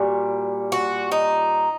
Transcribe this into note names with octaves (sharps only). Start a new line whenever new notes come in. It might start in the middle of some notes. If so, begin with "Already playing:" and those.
Already playing: A#2 G3 F#4
F#4
D#4